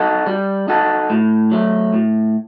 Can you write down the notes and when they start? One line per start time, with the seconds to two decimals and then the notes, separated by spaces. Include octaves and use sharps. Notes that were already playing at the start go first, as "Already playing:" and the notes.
Already playing: D#4 F#4 A4
0.26 G3
0.68 D#4 F#4 A4
1.10 A2
1.52 F#3 A3
1.94 A2